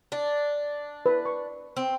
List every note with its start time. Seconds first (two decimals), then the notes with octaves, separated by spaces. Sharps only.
0.12 D4
1.06 B4
1.25 C#6
1.77 C4